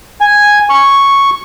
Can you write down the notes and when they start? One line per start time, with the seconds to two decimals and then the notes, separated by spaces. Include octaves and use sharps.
0.21 G#5
0.69 C#6